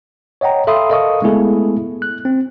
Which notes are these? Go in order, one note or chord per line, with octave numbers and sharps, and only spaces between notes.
C#5 D#5 F#5 G5 A#5
A4 E5 F5 B5 C6 D#6
A4 A#4 D#5 F5 C#6 D#6
G#3 A3 B3 E4 G#4 A4
F#6
C4